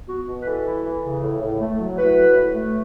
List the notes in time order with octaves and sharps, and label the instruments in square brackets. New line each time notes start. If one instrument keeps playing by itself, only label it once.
[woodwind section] B3 F#4
B2
B4
E3 A4
E4
E3
C#3
A2
A2
A3
F#3
E4 F#4 B4
A2
A2
A3